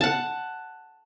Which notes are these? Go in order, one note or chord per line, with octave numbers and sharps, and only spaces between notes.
F#5 A5